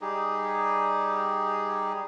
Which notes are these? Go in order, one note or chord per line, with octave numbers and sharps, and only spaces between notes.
G3 D#4 G4 G#4